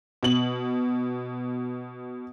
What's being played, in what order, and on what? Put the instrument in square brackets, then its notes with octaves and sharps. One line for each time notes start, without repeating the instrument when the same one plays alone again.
[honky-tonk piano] B2 F#7